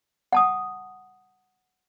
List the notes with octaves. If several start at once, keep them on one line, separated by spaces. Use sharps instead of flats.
F#5 A5 D#6